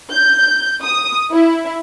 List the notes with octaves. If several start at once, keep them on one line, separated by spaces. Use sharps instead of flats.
G6
D#6
E4